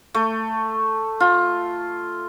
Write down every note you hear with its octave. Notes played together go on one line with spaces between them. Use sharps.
A3
F4